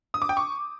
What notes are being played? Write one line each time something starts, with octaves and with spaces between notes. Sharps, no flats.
D#6
D6
G5
C#6